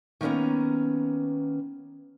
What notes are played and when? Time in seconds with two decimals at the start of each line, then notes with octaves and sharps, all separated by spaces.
0.21 D#3 A#3 B3 C#4 A#5